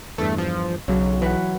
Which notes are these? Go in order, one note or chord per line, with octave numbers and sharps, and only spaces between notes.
E2 G2 A3
F3
B1 C#3 F#3
E3 B4 F#5